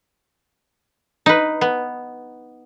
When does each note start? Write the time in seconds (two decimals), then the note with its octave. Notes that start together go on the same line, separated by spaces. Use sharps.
1.26 D#4 B4
1.61 B3